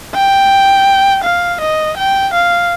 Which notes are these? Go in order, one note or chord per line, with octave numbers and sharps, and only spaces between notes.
G5
F5
D#5
G5
F5